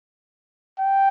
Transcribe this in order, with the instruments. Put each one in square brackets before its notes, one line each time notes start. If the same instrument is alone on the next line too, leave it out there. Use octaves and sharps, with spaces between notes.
[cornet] G5